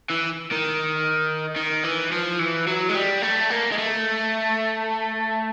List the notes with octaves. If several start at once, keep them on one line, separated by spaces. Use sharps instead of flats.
E3
D#3
D#3
E3
F3
E3
F#3
G#3
G3
A3
A#3
G#3
A3